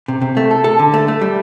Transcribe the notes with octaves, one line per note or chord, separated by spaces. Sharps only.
C3
C3
A3
A4
A4
D3
A3
A3
G3